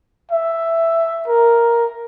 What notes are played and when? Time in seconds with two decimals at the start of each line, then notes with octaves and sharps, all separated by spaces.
0.31 E5
1.28 A#4